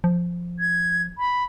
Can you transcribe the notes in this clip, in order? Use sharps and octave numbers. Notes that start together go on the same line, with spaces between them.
F3
G#6
B5